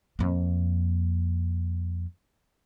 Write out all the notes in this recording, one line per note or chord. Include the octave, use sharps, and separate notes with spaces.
F2 A#3